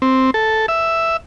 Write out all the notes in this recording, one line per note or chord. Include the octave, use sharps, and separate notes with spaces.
C4
A4
E5